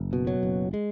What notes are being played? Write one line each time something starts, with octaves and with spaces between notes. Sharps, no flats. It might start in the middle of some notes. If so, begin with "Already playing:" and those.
Already playing: F#1
B2
F#3
F#1
G#3